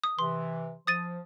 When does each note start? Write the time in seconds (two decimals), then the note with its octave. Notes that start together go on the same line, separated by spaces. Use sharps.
0.04 D#6
0.19 C3 E3 C6
0.87 F3 D#6 A6 D#7